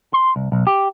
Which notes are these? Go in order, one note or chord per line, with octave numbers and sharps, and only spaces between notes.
C6
C2
B1
G4